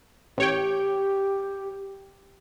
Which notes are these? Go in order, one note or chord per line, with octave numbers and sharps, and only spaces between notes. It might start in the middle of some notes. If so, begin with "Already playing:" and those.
A1 G4 C#5 G5